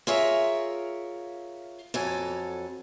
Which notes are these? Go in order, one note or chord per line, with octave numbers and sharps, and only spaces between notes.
F4 G#4 A#4 C#5 E5
F2 F#3 A4 G#5